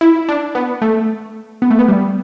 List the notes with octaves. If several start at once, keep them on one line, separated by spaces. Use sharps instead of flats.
E4
D4
B3
A3
B3
A3
B3
G3